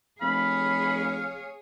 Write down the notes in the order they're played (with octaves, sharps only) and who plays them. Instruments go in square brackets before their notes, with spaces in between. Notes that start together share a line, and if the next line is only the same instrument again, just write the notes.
[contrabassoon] F1 [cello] G#4 C#5 [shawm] F5 [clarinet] B5